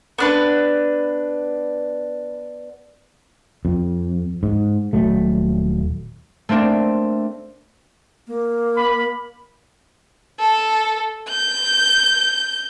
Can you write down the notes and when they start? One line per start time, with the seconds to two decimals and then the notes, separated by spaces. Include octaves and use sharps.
0.18 B3 D4 B4
3.65 F2
4.43 G#2
4.93 D#1 F#3 A3
6.49 A3 A#3 C4 D4
8.27 A#3
8.76 B5
10.39 A4
11.29 G6